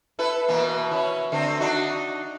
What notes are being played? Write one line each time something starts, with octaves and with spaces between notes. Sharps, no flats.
E4 A4 B4
B2 E3 A#3
C#4 E4
D3 A3 C4
D4 D#4 F#4